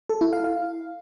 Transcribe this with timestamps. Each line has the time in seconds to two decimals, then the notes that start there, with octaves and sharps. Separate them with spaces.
0.09 A4
0.21 E4
0.33 F5
0.44 F5